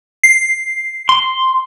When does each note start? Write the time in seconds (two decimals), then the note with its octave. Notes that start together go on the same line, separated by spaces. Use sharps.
0.23 C7
1.09 C6